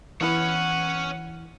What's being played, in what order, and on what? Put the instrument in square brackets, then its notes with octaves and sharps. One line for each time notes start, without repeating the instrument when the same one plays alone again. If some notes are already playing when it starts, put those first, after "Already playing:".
[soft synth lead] E3 [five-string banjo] B3 E4 B4 [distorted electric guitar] C#4 C#5 [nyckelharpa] F#5